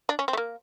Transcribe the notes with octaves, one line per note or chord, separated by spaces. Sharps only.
D4
C#4
C4
A3
A#3